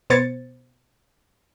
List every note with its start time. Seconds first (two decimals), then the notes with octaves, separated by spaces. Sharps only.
0.10 B2 B3 C5 G#6 A6 C#7